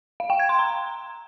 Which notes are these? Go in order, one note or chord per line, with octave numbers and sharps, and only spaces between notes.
F5
G5
G#6
C6
A#5